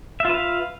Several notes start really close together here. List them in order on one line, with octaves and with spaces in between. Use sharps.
E5 F4 B4 F5